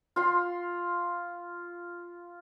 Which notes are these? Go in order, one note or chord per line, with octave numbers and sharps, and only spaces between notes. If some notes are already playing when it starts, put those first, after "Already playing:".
F4 C6